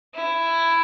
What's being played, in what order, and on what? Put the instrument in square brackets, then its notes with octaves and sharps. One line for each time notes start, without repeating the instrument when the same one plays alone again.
[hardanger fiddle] E4